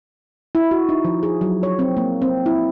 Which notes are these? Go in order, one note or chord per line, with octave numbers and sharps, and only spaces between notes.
E4
F#4
D#4
F3
G#4
F#3
C#5
C4
A#3
C4
E4